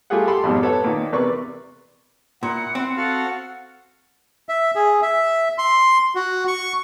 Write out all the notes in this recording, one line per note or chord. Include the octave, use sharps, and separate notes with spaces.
G3 A3 F4 G4 G#4 F#5
G4 A4 B5 C6
F2 G#2 B2 F#3 G3
A4 B4 C#5 F#5
A#2 D#3
E2 C3 A#4 B4 D5 C#6
A#2 E4 F#5
C4
F#4 A4 F5 F#5
E5
G#4
E5
C6
F#4
C#6